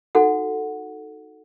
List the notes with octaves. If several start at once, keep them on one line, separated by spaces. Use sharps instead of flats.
D#4 F#4 A4 F#5